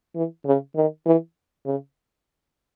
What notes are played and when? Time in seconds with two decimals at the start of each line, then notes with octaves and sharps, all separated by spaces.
0.16 E3
0.46 C#3
0.76 D#3
1.06 E3
1.66 C#3